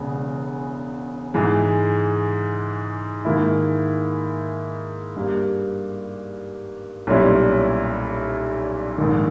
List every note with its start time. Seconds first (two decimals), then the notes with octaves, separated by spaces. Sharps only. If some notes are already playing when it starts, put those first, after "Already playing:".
Already playing: E1 E2 C#3 G#3 B3
1.34 G#2 E3 G#3
3.25 G#2 D#3 A#3 E4
5.16 G2 G3 A#3
7.07 B1 A#2 G3 C#4 E4
8.98 A#1 G#2 D#3